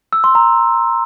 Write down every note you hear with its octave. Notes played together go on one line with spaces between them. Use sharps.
E6
C6
A#5